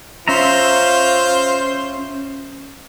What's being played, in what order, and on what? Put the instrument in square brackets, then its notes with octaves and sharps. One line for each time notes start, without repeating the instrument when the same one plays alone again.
[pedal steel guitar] C#4 E5 A#5 [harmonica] F4 C5